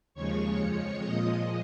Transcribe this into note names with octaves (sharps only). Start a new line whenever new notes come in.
D#2 C#3 F3 G#3 C#5 C#6
F2 F3 G#3
A#2 F3 G#3 D#5 D#6